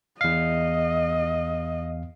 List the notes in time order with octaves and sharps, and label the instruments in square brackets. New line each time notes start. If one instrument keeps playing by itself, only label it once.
[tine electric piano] E2 F5 [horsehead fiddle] D#5